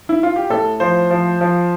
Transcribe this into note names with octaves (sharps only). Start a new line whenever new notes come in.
E4
F4
G4
A2 A4
F3 C5
F3
F3